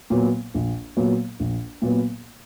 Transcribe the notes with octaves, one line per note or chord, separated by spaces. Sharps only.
A#2 F#3 B3
A#1
A#2 F#3 B3
A#1
A#2 F#3 B3